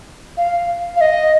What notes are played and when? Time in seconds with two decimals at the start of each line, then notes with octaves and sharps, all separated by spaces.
0.37 F5
0.96 F5
1.01 D#5